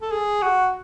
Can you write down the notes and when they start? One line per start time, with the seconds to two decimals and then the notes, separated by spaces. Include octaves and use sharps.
0.02 A4
0.12 G#4
0.42 F#4